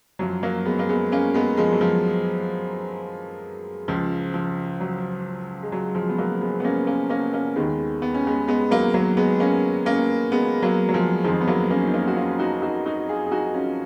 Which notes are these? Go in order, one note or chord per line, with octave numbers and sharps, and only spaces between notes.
F#2 F3 F#3
F#3 A#3
G#3 B3
A#3
G#3 B3
A#3 C#4
G#3 B3
F3 G#3
F#3
F3
C#2 C#3 F3
F3
F#3
G#3
F#3
F3 G#3
B3
F#3 A#3
G#3 B3
B3
A#3 C#4
A#3 C#4
A#3 C#4
A#3 C#4
D#2 D#3 G#3 B3
B3
C#4
G#3 B3
G#3 B3
F#3 A#3
F#3 A#3
G#3 B3
A#3 C#4
A#3 C#4
G#3 B3
F#3 A#3
F#3
F3 G#3
F2 D#3 F3 G#3
B3
F#3 A#3
A#3 C#4
D#4
A#3 C#4
F#4
C#4 F4
D#4 F#4
D#4 F#4
D#4 F#4
F4 G#4
G#4
D#4 F#4
C#4 F4